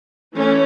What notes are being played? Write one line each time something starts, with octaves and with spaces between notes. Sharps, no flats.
E3 A3 C#4